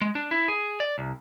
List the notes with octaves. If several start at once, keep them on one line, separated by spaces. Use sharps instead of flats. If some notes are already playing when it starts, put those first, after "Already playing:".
G#3
D4
E4
G#4
D5
C2